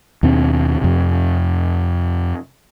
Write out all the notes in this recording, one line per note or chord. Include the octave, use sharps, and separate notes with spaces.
D#2 B2 C4 D4
F2 C3